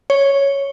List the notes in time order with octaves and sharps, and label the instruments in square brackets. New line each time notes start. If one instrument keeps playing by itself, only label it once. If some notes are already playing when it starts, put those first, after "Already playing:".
[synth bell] C#5